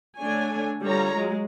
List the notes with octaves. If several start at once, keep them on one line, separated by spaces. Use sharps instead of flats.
D3 A3 D4 C#5 G#5
D3 G3 F4 C#5 A#5
F#3 G#3